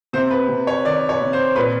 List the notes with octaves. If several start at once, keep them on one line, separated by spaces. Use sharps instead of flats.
C3 C5
B4
C3
C#5
D#3 D5
C#5
C3
C5
A#2 B4